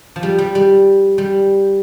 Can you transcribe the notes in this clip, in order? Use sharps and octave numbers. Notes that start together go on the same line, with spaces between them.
F3
G3
G3
G3
G3